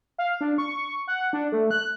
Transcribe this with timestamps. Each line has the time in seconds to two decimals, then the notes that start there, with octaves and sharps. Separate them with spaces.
0.19 F5
0.41 D4
0.58 C#6
1.07 F#5
1.33 D4
1.52 A3
1.71 F#6